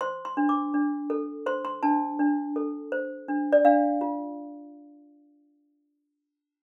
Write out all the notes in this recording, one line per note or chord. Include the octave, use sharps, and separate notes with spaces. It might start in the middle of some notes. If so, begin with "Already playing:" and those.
C5 C6
C6
D4
D6
D4
A4
C5 C6
C6
D4 A5
D4
A4
C5
D4
D5
D4 F5
F4